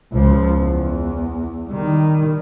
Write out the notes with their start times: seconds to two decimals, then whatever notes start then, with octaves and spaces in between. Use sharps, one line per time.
0.13 C#2 F3
0.59 E2
1.68 D#3 G3